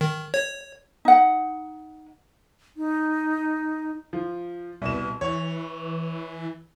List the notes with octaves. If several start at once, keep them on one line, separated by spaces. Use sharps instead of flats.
D#3
C#5
D#4 F#5
D#4
F3
C2 B2 E7
E3 C#5